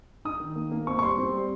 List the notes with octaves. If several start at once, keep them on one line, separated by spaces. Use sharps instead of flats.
D#4 D#6
D#3
A#3
A#3
C4 C#6
C#6
G3 C6
C4
G3